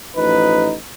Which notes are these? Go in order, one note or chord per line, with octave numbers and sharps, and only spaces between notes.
A1 F3 D#4 B4